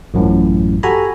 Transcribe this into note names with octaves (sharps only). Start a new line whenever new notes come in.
A1 F#2 A2
F#4 G4 A4 G#5 A#5 B5